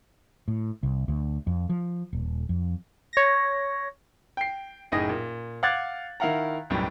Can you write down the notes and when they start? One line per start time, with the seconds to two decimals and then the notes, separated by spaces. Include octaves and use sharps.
0.48 A2
0.83 C2
1.08 D2
1.47 F2
1.69 F3
2.13 D#1
2.49 F2
3.13 C#5 A#6
4.37 G5 C7
4.92 F#1 A2 D#4 G#4 D#6 A#6
5.09 A#2
5.63 F5 F#5 D6 F#6 G#6 A6
6.20 D#3 E4 F5 F#5 A#5
6.70 B1 F#2 A2 G3